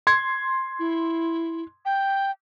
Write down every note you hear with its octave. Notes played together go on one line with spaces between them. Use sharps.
C6 G#6
E4
G5